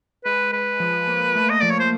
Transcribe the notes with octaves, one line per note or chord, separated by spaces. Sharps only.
G#3 B4
G#3 B4
F3
A#3
A3
D#5
F3 D5
C#5
C5